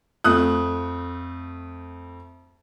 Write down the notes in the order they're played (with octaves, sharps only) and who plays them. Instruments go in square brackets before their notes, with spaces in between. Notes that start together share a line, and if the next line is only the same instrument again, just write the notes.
[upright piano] F2 A3 D#6 F#6